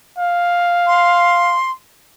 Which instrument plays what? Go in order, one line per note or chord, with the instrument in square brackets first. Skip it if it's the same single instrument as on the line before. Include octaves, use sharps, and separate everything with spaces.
[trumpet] F5
[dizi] C6